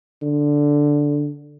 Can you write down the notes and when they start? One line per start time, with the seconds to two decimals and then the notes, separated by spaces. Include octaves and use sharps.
0.22 D3